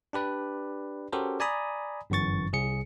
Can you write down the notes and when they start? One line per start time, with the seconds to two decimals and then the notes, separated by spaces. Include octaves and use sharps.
0.13 D4 G4 B4 D5
1.13 C#4 F#4 G4 A4 A#4 C5
1.40 D5 G#5 A#5 B5 D#6
2.10 G1 F#2 E3 C#6 A6
2.53 C2 G#4 C#7